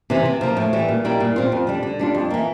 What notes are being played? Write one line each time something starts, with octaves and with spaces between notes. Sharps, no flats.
C3 E3
C3
F3 A#3
A2
E3 G3
A#2
G3 A#3 E4
A#2
G3 C4 F4
F2
D3 G3 D4
D3
G3 D4 F4
F2
E3 A#3